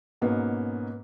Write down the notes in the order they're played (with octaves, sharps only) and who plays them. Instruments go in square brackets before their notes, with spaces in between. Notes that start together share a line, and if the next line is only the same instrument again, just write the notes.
[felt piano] G#2 B2 A#3 B3 C#4